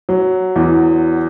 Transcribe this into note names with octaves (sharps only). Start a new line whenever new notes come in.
F#3
E2